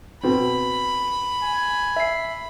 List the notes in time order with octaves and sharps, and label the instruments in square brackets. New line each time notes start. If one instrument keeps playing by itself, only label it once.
[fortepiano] B2 C4 [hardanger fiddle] B5
[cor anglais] G#5
[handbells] E5 C7